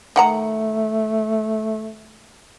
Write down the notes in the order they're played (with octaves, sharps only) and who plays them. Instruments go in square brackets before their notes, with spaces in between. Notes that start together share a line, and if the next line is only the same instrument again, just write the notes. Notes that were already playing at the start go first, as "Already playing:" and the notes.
[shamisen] D#3 F#5 A#5 [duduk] A3